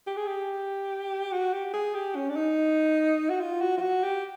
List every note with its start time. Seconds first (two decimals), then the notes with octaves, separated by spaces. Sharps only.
0.07 G4
0.16 G#4
0.27 G4
1.32 F#4
1.53 G4
1.73 G#4
1.94 G4
2.16 C#4
2.29 D4
2.36 D#4
3.29 F#4
3.40 F4
3.61 F#4
3.77 F4
3.82 F#4
4.03 G4